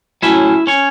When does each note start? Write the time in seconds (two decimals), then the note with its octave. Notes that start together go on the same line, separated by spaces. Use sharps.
0.23 A2 F#3 C#4 E4 E5
0.67 C#4 C#5